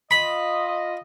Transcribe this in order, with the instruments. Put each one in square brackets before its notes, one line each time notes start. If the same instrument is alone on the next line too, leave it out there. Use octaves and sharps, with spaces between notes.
[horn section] F4 D#5 [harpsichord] B5